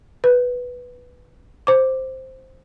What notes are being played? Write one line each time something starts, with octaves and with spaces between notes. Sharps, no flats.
B4
C5 D6